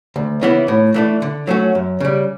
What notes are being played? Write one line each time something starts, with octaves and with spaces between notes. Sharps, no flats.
D2
C#3 E3 B3 E4
A2
E3 A3 D4
D3
F#3 A3 C#4 F#4
F#2
C#3 G3